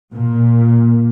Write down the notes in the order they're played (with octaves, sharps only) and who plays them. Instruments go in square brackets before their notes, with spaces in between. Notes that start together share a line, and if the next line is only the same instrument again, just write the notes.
[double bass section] A#2